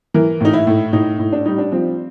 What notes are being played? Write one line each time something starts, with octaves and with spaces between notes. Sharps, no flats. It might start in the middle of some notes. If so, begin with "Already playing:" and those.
E3 A#4
A2 D#4
E4
A2
A2 D#4
A2
D4
G3 D#4
D4
F3 C4